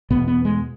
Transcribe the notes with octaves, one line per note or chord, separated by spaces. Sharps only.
E2 B2 B3
B3
G#3